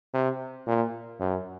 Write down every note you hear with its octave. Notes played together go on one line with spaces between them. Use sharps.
C3
A#2
F#2